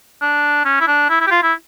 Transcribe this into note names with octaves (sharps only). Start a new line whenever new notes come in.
D4
C#4
E4
D4
E4
E4
G4
F4
E4